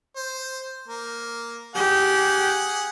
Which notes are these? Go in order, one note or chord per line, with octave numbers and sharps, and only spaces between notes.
C5
A#3
G4 G#4 F#5